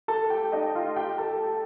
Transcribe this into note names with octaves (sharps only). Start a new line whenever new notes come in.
A4 A5
G4 G5
D#4 D#5
F4 F5
G4 G5
A4 A5